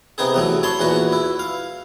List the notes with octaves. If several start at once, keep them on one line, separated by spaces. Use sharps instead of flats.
C3 B3 D#4 G#4
E2 F#3 A3
C#5 A5 B5 C6
E2 A#2 F#4 B4
E4
F5